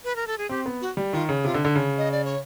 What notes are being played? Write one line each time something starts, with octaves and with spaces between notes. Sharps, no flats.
B4
A#4
A4
G#4
C4 G4
B3
F#4
G3
D#3 F4
C#3
C3 F4
D3
D3
C#3
D#5
D5
C#5